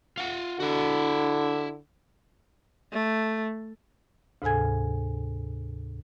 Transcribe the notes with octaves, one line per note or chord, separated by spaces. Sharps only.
F4 F#5
D3 E4 F#4
A3
D2 G#2 C3 A4 G#5 G#6